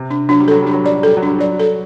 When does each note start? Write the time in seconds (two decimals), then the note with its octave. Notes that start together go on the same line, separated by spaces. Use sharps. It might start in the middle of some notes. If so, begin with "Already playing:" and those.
Already playing: C3
0.11 D4
0.29 F#3 D4
0.40 G3
0.48 F#3 A4
0.62 G3 D4
0.73 F#3
0.84 G3 D5
0.95 F#3
1.03 G3 A4
1.17 F#3
1.22 D4
1.28 G3
1.39 F#3 D5
1.60 A4